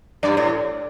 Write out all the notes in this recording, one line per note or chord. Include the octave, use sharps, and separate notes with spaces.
G2 D5
A2